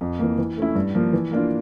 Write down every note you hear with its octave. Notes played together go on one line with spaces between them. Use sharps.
F2
E3 A#3
E3
A3 C#4 E4
G2
F3 A#3
E3
A#3 D4 F4